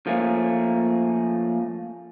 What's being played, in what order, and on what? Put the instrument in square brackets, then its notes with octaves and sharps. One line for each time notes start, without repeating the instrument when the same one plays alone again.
[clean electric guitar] F3 A3 A#3 C#4